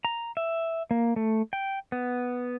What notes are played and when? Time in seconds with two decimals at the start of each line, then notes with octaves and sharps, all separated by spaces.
0.05 A#5
0.37 E5
0.91 A#3
1.16 A3
1.53 G5
1.92 B3